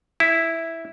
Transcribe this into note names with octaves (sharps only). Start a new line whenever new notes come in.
E4